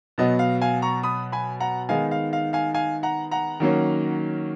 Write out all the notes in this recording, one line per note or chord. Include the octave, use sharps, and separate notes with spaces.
B2 F#3 B3 D#5
F5
F5 G#5
A#5 C#6
B5 D#6
G#5 B5
F#5 A#5
D#3 G#3 B3 D#4 F5 G#5
F5
F5
F5 G#5
F5 G#5
F#5 A#5
F#5 A#5
D#3 F#3 A#3 C#4